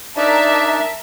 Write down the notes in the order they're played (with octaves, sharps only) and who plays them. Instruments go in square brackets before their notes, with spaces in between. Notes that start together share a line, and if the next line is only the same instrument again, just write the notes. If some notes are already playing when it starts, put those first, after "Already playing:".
[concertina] D4 D#4 D5 [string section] A#4 E5 A5